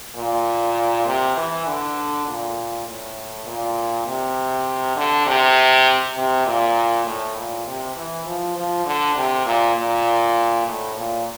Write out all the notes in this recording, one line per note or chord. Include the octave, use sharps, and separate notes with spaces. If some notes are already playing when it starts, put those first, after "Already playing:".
A#2
C3
E3
D3
A#2
A2
A#2
C3
D3
C3
C3
A#2
A2
A#2
C3
E3
F3
F3
D3
C3
A#2
A#2
A2
A#2